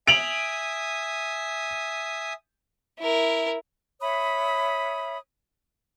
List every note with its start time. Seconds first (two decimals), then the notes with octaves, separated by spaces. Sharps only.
0.07 E5 G#5 D#6 D7 F7 F#7
2.99 E4 A#4
4.01 C#5 E5 B5 D#6